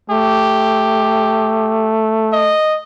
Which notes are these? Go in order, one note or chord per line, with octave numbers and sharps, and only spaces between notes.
A3 G4
D#5